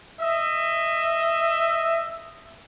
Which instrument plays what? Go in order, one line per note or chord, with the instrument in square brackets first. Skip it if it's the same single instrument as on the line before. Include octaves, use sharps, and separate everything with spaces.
[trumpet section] D#5 E5